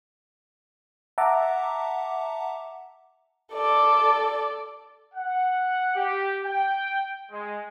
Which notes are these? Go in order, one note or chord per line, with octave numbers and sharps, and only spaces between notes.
E5 F#5 A5 A#5 D6
A4 D5
F#5
G4
G5
G#3